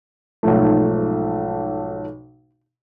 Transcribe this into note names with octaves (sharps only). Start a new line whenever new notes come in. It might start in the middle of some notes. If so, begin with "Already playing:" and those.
B1 G#2 F3 A3